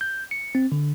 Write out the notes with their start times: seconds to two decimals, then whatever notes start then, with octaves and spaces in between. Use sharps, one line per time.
0.01 G6
0.31 C#7
0.55 C4
0.72 D3